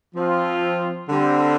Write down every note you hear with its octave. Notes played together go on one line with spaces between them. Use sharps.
F3 C4 F4
D3 G3 C4